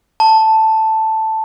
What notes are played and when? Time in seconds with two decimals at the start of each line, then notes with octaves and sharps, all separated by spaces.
0.20 A5